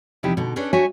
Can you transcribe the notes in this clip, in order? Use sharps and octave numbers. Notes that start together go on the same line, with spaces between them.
E2 C3 F3 D#4 E4 G4
B2 D3 D#4
C#4 D4 G#4 A4 B4 D5
G3 D4 F#4 C#5 E5 G#5